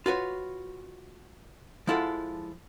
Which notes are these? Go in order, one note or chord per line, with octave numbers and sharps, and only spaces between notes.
F4 F#4 B4 C#5
F3 G#3 E4 F4 A4 F#5